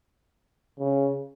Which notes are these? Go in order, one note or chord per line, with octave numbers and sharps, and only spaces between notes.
C#3